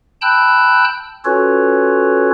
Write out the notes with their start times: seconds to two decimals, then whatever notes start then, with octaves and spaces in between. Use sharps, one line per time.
0.22 G5 A5 B5 E6 F#6 G6
1.25 C#4 F4 F#4 A4 B4 C#5